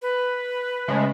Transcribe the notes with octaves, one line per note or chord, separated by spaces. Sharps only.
B4
C#3 G#3 A3